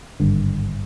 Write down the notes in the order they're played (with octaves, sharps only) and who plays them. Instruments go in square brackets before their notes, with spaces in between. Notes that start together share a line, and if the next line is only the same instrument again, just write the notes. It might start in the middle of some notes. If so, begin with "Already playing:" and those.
[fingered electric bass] G#1 G2 D3